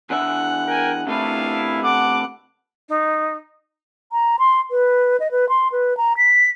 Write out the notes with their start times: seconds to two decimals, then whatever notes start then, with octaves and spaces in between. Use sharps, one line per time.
0.10 E2 D4 E5 F#5
0.65 A#4 G5 G#5
1.07 C3 A3 B3 D4 E4 F5
1.83 A4 F#5 D6
2.89 D#4
4.12 A#5
4.39 C6
4.71 B4
5.20 D#5
5.31 B4
5.49 C6
5.72 B4
5.97 A#5
6.17 B6